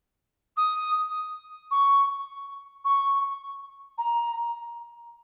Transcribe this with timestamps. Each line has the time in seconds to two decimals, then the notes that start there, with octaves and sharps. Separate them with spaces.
0.56 D#6
1.71 C#6
2.84 C#6
3.98 A#5